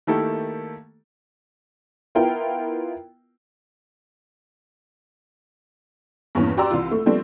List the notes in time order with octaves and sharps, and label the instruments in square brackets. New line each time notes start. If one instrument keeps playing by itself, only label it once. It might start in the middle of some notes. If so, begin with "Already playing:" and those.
[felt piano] D#3 A3 A#3 E4 G4 A4
[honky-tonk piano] B3 E4 F4 A#4 G5
E2 G2 A#2 E3 C#4
F#4 G4 D5 A#5 C6 E6
C2 E3 F4
A3
F3 G3 A3 B3 C4 D4